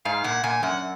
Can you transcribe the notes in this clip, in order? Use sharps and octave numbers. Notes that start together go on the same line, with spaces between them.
G#2 F5
A#2 F#5
A#2 G#5
F#2 F#5